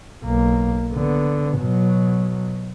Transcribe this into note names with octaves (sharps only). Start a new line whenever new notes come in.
B1 A#3
D3 B3
B2 F#3